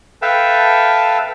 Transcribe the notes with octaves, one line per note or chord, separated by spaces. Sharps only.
A4 B4 E5 F5 G5 A5